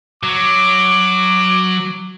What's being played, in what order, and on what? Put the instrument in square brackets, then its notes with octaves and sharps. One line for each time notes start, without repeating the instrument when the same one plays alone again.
[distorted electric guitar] F#3 [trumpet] D6